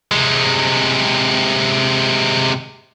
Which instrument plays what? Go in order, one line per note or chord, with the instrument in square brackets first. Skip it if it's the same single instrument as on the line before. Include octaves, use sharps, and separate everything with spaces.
[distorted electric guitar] C3 G#3